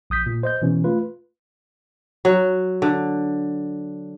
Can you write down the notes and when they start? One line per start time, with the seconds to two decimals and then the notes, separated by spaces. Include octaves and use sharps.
0.10 A#1 D#6 G6 B6
0.26 A#2
0.43 C5 D#5 G6
0.62 B2 E3 C#4
0.84 A3 F4 B4
2.25 F#3
2.82 D3